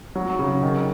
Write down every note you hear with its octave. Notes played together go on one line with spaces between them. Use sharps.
F#3
C#3
D#3